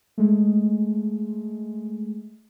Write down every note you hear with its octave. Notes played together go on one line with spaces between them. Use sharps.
G#3 A3